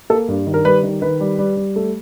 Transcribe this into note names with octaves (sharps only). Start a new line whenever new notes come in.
A#3 A4
G2
D#3
A#4
G3 B4
D#3
D#3 B4
G3
G3
G3
A3